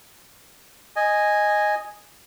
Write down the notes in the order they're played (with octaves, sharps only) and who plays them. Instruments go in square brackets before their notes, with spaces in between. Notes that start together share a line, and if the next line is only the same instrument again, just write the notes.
[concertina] D#5 G#5